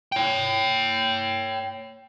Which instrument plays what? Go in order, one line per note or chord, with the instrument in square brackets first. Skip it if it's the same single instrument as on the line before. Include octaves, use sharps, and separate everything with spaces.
[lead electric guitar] C#5 G5